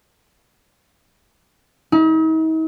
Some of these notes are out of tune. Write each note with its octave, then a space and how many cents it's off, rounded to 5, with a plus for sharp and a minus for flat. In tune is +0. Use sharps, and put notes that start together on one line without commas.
D#4 +45